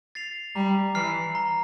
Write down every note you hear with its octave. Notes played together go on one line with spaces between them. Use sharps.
A6 C7 F7
G3 A#5
E3 F6 C7
A#5